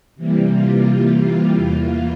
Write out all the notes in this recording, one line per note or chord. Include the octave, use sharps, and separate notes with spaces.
C3 E3 G3 A#3
F4
F4
E2 E3 A#3 F4